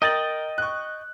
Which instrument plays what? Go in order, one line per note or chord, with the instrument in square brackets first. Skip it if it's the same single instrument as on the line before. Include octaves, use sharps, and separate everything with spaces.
[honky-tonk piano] A#4 A6 F#7 [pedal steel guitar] D#5 G5
[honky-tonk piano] C#6 F#6